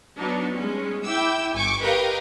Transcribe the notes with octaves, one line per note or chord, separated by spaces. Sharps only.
F#3 B3 D4 D#4
G3 G#3 C#4
E4 E5 G5 D6 E6
G1 G#5 C#6 D6
G4 A#4 B4 D#5 F5 G5